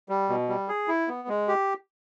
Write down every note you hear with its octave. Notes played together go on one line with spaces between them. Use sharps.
G3
B2
G3
G#4
E4
B3
G#3
G4